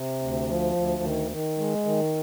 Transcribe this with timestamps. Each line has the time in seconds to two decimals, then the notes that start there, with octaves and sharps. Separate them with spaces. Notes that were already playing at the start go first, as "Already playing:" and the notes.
Already playing: C3
0.22 D2
0.49 F3
0.76 D2
1.03 D#3
1.32 D#3
1.58 G#3
1.86 D#3